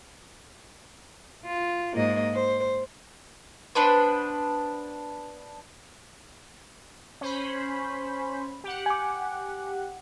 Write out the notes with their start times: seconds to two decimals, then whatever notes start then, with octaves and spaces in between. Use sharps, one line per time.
1.46 F4
1.96 G#2 A#3 D#5
2.34 C5
3.75 B3 D4 B4 C5
7.21 C#4 C5 B5
8.64 G4 F#5
8.86 G#5 D6